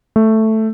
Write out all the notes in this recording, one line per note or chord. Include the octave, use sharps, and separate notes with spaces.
A3